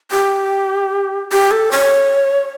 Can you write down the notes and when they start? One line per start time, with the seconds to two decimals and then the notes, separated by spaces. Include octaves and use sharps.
0.11 G4
1.32 G4
1.51 A4
1.71 C#5